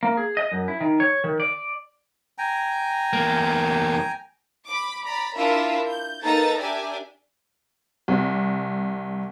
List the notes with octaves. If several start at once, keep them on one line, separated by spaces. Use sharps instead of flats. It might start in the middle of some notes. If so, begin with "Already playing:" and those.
A#3
G#4
D#5
F#2
E4
D#3
C#5
D#3
D5
G5 G#5 A#5
E2 A#3
B5 D6
D5 A#5 B5
D4 E4 F4 A#4 E5 F5
G6
A#3 D#4 A4 B4 A#5 A6
D4 G4 A#4 D5 E5 G#5
C2